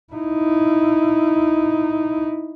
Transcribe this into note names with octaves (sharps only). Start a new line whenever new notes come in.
D#4 E4